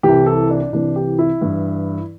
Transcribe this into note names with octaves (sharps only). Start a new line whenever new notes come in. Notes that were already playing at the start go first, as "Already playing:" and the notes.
C2 C3 E3 G4
A4
D4
C2 C3 E3 D4
G4
E4
G2 E3